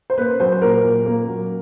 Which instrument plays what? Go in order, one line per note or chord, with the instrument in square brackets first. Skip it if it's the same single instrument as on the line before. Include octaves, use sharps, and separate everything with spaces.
[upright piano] C5
A#3 B4
F#3 C5
A#2 A#4
A#2
A#3
F#3